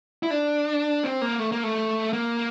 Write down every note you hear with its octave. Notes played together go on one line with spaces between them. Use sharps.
E4
D4
C4
A#3
A3
A#3
A3
A#3